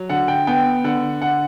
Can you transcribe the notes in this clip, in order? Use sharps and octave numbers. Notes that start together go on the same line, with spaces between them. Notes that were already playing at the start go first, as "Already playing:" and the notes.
Already playing: F#3
D3 F#5
G5
B3 G5
D3 F#5
D3 F#5